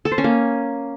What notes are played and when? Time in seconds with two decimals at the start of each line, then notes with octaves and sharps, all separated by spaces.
0.05 A4
0.12 C5
0.18 C#4
0.24 A#3